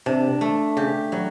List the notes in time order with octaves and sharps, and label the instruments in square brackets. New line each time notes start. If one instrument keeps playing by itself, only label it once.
[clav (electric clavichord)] C3 [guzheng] D4
[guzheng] A3
[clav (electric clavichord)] C#3 [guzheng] G4
[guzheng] F#3 [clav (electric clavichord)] G3